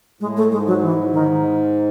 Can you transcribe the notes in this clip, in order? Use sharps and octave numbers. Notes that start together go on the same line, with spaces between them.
A2 G#3
A3
G#2 G#3
F#3
E3
D#3